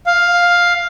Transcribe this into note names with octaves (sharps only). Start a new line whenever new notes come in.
F5